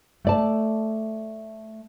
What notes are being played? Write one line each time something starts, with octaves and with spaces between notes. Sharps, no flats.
A3 D5 A5